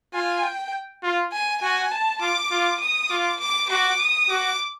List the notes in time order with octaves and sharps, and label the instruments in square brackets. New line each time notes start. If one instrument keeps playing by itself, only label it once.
[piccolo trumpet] F4 [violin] G#5
[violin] G5
[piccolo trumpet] F4
[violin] G#5
[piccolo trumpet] F#4 [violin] G#5
[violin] A5
[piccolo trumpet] F4 [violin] D6
[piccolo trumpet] F4
[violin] D#6
[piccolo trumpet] F4 [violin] D6
[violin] D6
[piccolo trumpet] F#4 [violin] D6
[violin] D#6
[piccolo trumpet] F#4 [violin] D6